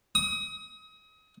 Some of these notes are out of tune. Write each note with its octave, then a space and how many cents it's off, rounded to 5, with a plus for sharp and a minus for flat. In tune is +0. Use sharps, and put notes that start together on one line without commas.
D#6 +35